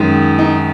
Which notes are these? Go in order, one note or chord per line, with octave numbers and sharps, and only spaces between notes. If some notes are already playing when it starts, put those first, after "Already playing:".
Already playing: F#2 D#3 G#3
D#4